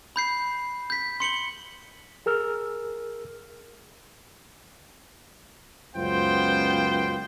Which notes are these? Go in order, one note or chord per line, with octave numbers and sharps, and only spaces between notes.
B5 G6 C7
G6 B6
C6 C#7 F#7 G7
G#4 A#4 E6 F6
C#2 F#2 B3 F4 C5 G5